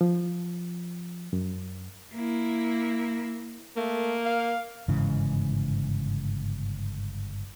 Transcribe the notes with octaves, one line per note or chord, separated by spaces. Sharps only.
F3
F#2
A#3 E4
A3 A#3
F5
G1 G#2 C#3 E3